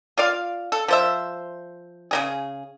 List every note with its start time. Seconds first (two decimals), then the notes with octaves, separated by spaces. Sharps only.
0.18 F4 D5 F5
0.72 A4
0.88 F3 C5 E5
2.11 C#3 F#3 G#4